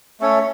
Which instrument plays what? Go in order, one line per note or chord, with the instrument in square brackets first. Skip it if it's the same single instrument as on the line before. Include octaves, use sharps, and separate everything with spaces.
[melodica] A3 C#4 A4 C#5